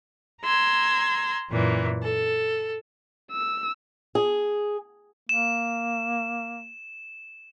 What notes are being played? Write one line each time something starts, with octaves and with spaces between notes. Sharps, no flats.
A#5 C6 E6 G#6
F#2 A#2 E3
A4
E6
G#4
A#3 E7